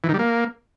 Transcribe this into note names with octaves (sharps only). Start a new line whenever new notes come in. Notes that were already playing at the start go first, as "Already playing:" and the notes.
E3
D#3
G3
A#3